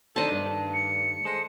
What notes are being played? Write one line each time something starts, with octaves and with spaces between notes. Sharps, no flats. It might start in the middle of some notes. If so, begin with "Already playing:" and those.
D#3 A3 D4 D#4 A4 C5 D#5 A5
G2
C#7
G#3 G#4 A4 C5